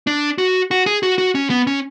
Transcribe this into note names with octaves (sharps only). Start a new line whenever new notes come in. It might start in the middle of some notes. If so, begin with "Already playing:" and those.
D4
F#4
F#4
G#4
F#4
F#4
C#4
B3
C#4